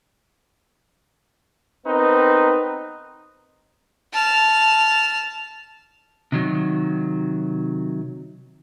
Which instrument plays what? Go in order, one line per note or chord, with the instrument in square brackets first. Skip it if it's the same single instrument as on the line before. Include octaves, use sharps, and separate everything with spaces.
[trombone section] B3 C4 D#4 A#4 B4
[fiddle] A5 F6
[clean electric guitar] C3 D#3 F#3